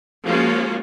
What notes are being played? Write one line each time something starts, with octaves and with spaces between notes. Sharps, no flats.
F3 G#3 A#3 C#4 F4 F#4